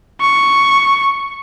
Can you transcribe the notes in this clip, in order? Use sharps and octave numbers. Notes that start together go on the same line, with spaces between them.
C#6